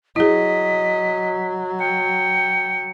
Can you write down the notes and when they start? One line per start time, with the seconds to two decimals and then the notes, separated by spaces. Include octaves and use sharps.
0.16 F#3 E4 G#4 D#5 B6
1.80 G5 C#7